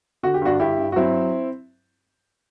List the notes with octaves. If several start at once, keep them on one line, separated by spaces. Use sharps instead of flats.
D3 F#4
G4
G2 D4 F#4
G2 E4 G4
G2
F#4
F#3 C4 E4